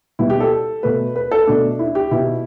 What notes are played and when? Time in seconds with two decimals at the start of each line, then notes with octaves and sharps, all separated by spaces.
0.19 B2 G3 B3 E4
0.30 G4
0.40 A4
0.83 B2 A3 B4
1.16 B4
1.31 A4
1.47 B2 A3 D4
1.79 E4
1.95 G4
2.11 B2 B3 E4